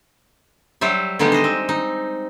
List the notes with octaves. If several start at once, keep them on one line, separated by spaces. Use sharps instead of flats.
F#3 G3 C5 E5
D3 G3 G#3 B3 D#4 G4
C5 D#5
C4
D#4